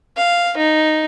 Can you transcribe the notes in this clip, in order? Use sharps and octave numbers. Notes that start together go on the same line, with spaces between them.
F5
D#4